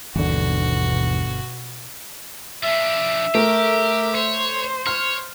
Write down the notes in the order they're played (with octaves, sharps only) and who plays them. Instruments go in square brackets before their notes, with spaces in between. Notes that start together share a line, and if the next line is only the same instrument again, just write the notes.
[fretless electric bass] G1 D3 [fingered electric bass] D#2 E3 [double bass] B2 [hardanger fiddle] F#4
[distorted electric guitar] F3 D4 [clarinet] E5
[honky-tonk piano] A3 [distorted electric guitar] G4 [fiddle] A#4
[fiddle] C5 [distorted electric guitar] C#5
[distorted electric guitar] C#5 [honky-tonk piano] F6